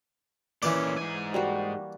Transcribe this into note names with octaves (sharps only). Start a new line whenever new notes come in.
A#2 E3 C#4 D5
G#2 G#5
G3 A#3 F#4